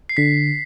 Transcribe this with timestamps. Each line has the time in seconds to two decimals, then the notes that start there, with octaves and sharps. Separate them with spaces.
0.09 C7
0.17 D3 B6